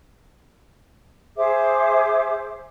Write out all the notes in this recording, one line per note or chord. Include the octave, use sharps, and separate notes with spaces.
G#4 C5 E5 D6